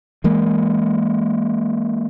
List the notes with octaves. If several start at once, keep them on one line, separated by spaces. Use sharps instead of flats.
E3 G#3 A#3